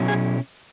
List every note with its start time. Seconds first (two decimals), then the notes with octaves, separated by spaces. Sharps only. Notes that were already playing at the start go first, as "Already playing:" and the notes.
Already playing: B2 F#3 C#4 E4
0.08 G#4